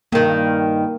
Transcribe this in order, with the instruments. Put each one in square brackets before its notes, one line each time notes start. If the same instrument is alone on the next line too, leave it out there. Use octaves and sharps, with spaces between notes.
[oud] G2 D#3 [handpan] A#3